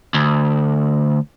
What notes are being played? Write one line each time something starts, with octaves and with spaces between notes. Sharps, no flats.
D2